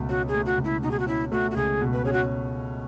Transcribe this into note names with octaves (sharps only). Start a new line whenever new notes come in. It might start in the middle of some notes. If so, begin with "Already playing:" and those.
Already playing: C#2 B2 A3
C#4 F#4
G#4
A3
F#4
C#2
E4
B2 D#4
G#4
F#4
C#4 E4
A3 F#4
F#4
C#2 G#4
B2
B4
C#4 G#4
F#4